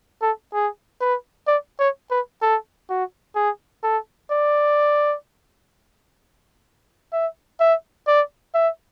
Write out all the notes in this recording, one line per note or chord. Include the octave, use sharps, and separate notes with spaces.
A4
G#4
B4
D5
C#5
B4
A4
F#4
G#4
A4
D5
E5
E5
D5
E5